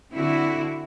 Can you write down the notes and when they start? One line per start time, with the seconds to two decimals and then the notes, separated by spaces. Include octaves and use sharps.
0.12 D3 C4 E4 F#4